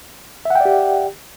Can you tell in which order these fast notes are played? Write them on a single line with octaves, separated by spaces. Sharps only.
E5 F#5 G5 D5 G4